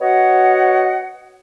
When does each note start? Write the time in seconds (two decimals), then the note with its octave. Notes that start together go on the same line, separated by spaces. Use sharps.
0.01 B3 F#4 C#5 D#5 F#5